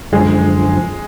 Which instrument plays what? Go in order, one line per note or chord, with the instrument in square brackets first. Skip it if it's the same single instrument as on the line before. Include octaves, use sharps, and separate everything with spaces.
[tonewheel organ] F#2 D3 F3 [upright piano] G#3